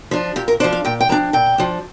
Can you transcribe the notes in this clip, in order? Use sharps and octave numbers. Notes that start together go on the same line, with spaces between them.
F3 D4
A#2 G4
A#4
F3 D4 C5
F5
A#2 G5
G5
F3 D4 A#5
A#2 G5
F3 D4